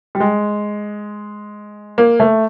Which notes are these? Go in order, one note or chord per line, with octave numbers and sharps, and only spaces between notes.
G3
G#3
A#3
A3